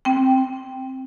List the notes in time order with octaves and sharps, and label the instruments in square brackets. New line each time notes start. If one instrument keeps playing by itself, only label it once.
[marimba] C4 G5